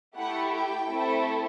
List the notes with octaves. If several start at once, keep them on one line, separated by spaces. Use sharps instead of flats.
A3 E4 G4 F#5
G5
A3 C4 E4 A4